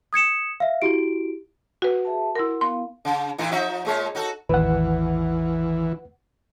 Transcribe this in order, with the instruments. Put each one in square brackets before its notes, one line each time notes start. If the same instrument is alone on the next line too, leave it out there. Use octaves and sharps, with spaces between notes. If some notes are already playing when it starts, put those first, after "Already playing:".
[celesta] D#6 G#6 C#7 E7
E5 F5
E4 F#4 G4 D7
[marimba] F#4 B4 [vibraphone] F#5
[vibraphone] G#4 E5 A5
[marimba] E4 A#4 [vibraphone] F#5 C6
[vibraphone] B3 E4 F5 [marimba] C6
[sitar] C#3
A2 E3 D#4
F3 D#4 E5
A#2 G#3 C#5
D#4 F#4 A4
[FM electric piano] A1 E2 D#3 [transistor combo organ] E3 [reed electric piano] B4 F#5